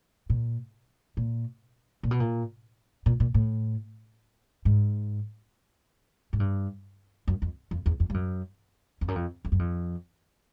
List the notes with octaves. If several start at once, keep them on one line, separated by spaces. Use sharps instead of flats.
A#2
A#2
A#2
B2
A#2
A#2
A#2
A2
G#2
G#2
G2
F#2
F2
F2
E2
F2
G2
F#2
F2
F#2
F2
F2
F#2
F2